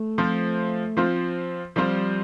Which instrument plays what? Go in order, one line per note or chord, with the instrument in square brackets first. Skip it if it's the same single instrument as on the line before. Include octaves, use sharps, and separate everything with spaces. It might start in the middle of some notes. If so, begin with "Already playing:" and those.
Already playing: [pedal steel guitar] A3
[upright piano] F3 C4 F4 C5
F3 C4 F4 C5
[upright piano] F3 C4 F4 C5 [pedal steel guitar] G3